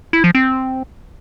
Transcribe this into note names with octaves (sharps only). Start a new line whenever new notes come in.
E4
F3
C4